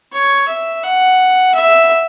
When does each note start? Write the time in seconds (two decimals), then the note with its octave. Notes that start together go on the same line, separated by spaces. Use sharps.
0.13 C#5
0.48 E5
0.83 F#5
1.54 E5